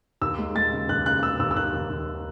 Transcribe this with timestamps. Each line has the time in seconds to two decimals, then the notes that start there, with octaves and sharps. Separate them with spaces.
0.21 D#2 E6
0.38 G#3
0.56 G#3 A6
0.72 C#3
0.89 D#2 F#6
1.06 C#3 F#6
1.23 C#3 E6
1.39 D#2 E6
1.51 E6
1.56 D#2 F#6
1.73 D#2
1.90 D#2